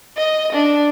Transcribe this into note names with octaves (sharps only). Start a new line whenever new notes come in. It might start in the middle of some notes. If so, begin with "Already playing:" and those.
D#5
D4